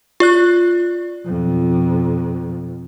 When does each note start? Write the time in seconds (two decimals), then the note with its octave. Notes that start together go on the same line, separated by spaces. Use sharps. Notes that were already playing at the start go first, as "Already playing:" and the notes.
0.20 F4 D5 F#6
1.26 F2 B2